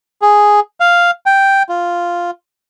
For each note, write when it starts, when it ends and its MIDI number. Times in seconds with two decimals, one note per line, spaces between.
0.22 0.60 68
0.80 1.11 77
1.26 1.63 79
1.69 2.31 65